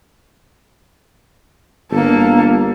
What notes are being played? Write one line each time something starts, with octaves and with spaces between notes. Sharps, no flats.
G1 A#3 A4